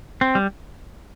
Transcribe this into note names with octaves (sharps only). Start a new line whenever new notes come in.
C4
G3